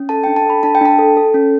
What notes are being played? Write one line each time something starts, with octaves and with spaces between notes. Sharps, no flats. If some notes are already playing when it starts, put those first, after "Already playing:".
Already playing: C#4
A4 A5
G5
D4
A5
A4 B5
D4 A5
G5
D4 A5
A4
A4
C#4